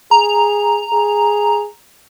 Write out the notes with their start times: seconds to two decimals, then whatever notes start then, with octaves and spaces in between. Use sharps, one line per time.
0.11 G#4 A#5
0.93 G#4